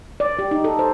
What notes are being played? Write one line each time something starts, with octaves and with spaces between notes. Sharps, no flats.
D5
G4
D#4
A4
C5